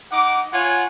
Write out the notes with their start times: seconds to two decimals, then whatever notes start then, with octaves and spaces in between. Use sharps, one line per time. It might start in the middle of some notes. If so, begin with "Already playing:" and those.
0.11 D#4 F#5 D6
0.53 F4 C#5 F#5 G#5